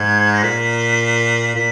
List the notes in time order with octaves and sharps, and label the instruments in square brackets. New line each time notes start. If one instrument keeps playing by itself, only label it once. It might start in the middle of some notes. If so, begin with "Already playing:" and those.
Already playing: [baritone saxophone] G#2 [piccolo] G#6
[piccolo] A#6
[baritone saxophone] A#2 [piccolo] B6
[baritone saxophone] A#2 [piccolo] B6